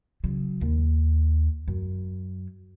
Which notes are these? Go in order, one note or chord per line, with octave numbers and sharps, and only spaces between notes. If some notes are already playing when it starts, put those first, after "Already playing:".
C#3 F#3
D#2
F#2